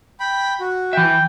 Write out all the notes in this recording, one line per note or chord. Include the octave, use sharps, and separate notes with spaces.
G5 B5
F#4
E3 E5 G5